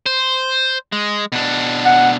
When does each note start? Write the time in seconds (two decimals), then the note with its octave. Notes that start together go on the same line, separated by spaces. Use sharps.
0.06 C5
0.92 G#3
1.32 B2 D4
1.85 F#5